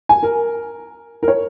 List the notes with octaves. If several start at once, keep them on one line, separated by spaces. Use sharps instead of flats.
G#5
A#4
A#4
C#5